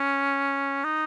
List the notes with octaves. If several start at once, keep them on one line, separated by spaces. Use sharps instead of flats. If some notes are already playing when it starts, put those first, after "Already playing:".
Already playing: C#4
D#4